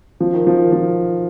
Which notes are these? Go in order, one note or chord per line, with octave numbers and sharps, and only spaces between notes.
F3
D#3
F3
D#3
F3